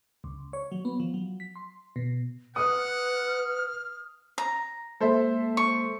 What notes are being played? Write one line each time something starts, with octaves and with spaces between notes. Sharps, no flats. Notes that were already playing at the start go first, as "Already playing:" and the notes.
C#2
C#5
F#3
B3
F3
F#3
B6
C6
B2
B4 F#5 D#6 F6
A#5
G#3 A#3 A4 C5 E5
C#6